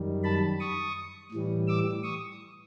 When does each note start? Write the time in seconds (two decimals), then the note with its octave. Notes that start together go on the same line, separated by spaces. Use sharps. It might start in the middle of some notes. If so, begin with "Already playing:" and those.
Already playing: F#2 D#3 G3
0.24 A5 B5
0.60 C#6 D#6
1.32 A2 E3 G3
1.68 D6 E6
2.03 C#6 D#6